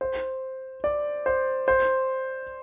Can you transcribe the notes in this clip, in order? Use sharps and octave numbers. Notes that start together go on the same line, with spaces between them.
C5
D5
C5
C5